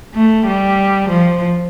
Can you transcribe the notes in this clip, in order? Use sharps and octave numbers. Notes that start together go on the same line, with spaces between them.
A3
G3
F3